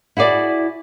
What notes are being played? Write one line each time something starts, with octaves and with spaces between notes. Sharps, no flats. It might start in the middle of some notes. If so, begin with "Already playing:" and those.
E4 F#4 G#4 D5